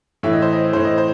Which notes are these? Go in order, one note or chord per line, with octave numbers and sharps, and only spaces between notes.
A2 E3 E5
D#5
C5
D#5
A2 E3 C5
D#5
C5